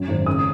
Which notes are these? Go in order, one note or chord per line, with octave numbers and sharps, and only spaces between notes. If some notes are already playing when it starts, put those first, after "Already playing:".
Already playing: F#2 F#3
G#1
C#3 D#6